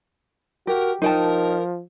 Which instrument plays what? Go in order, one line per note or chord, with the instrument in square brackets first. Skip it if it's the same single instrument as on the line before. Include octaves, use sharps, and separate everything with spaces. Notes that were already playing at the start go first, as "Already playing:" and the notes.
[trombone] F#4 [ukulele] G4 [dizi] A#4
[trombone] F3 [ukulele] D#4 G5 A5 [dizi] A#4